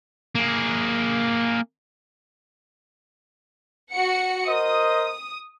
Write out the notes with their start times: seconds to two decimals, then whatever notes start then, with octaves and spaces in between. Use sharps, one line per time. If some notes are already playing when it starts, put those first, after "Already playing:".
0.35 A#3 G#4
3.93 F#4 F#5 C#7
4.48 A#4 C5 D#5 D#6